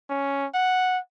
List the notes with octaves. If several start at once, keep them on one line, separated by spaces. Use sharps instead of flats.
C#4
F#5